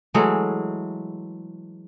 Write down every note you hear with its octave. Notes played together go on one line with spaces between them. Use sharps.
E3 F#3 G#3 A3